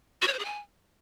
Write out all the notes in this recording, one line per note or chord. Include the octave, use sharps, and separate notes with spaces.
F#4
C#5
C5
G#4
G#5